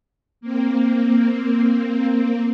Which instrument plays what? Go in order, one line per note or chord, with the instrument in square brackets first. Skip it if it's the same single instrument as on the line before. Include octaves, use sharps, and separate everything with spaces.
[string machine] A#3 C4